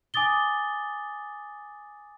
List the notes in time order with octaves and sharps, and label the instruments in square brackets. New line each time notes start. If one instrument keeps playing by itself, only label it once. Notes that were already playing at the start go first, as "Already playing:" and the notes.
[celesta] G#5 D6 D#6 A6 G7